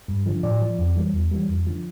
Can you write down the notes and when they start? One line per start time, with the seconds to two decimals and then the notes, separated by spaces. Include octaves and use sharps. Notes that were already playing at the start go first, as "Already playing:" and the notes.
0.08 G2
0.26 D3 F3
0.43 A2 D5
0.61 F3
0.79 F2
0.96 E3 G3
1.13 E2
1.31 E3 G3
1.48 F2
1.67 D3 F3